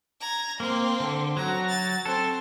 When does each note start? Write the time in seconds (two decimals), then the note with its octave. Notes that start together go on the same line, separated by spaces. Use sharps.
0.20 A#5 G#6
0.60 A#3 C4
1.00 D3
1.37 F#3 F#4 A#5
1.69 A6
2.06 C4 A4